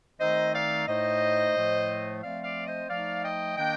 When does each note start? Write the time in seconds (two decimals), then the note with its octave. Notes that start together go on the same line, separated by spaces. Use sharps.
0.20 D#3 A3 C4 D#4 C5 D#5
0.54 D5 F5
0.87 A2 A3 D#4 C5 D#5
1.55 A2 F3 A3
2.22 F3 A3 C4 D5 F5
2.44 D5 F5
2.67 C5 D#5
2.89 F3 A3 D#4 D5 F5
3.22 D#5 G5
3.57 D#3 A#3 D4 D#5 G5